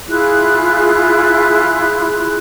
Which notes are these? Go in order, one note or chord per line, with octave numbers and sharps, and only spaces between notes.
E4 F4 G#4 F#6